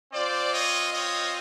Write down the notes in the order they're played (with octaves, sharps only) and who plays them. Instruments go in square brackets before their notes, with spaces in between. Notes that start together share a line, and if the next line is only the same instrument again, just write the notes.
[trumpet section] C4 F4 C5 D5
C#5 D#5
C#5 D#5